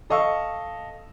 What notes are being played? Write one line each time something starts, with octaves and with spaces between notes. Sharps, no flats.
A4 D#5 F5 C#6 E6